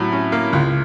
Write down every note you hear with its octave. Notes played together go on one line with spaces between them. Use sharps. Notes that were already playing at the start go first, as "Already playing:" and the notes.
Already playing: A2 F#3
C#4
A#3
C#2